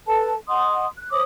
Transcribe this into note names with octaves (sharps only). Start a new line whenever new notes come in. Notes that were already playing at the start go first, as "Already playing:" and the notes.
A4 B4 A5
D#5 F#5 C6 D#6
F#6
C5 C#5 D6 D#6